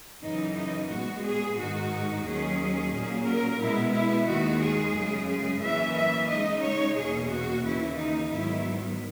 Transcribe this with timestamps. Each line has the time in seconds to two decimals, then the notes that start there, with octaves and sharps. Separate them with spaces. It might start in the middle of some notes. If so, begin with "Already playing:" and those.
0.21 F#2 C#3 E3 D#4
0.55 D#4
0.89 A#2 G#3 B3 F#4
1.24 G#4
1.56 G#2 D#3 G#3 D#4 F#4
2.24 D#2 D#3 F#3 C#4 G#4
2.92 A#2 F#3 A#3 C#4
3.26 A#4
3.59 B2 G#3 B3 E4
3.93 E4
4.27 D#2 D#3 G#3 F#4
4.61 G#4
4.95 F#2 C#3 G#3
5.29 G#4
5.62 F#2 E3 A#3 C#4 E5
5.96 E5
6.29 C#3 G#3 D#4 D#5
6.63 C#5
6.97 E2 B2 A#3 C#4 G#4
7.31 F#4
7.64 D#2 C#3 E3 E4
7.98 D#4
8.32 G#2 D#3 F#3 B3 E4